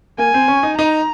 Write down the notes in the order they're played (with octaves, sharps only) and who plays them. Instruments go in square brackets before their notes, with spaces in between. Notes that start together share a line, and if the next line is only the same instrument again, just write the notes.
[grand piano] A#3 [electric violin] G#5
[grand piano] C4
C#4
D#4
[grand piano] D#4 [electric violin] A#5